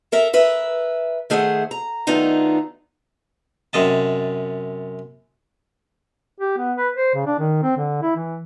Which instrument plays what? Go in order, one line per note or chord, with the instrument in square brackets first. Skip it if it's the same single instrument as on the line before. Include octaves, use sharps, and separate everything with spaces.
[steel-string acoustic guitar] A4 A#4 E5
A#4 B4 E5
D#3 A3 G#4 C5 E5 F#5
A#5
D#3 A3 B3 D4 D#4 F4
[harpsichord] F#2 C3 D#5 A5
[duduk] G4
B3
B4
C5
C#3
D4
D#3
C4
D3
E4
E3